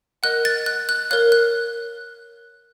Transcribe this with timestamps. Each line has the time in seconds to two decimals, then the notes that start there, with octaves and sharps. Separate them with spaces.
0.23 A#4 D#5 F#5 F#6
0.45 A6
0.66 F#6
0.89 F#6
1.10 A#4 C#5 F5 F#6
1.32 F#6